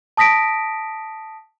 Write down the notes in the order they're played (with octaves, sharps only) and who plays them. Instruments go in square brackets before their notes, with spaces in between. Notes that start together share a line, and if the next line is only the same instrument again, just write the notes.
[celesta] A5 D#6 A#6 B6 D7